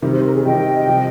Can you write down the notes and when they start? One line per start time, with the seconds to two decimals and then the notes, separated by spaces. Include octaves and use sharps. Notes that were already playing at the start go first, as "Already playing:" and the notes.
0.02 C3 D#3 G3 A#4
0.12 C5
0.23 A#4
0.33 G#4
0.44 C3 D#3 G3 D#5 G5
0.87 C3 F3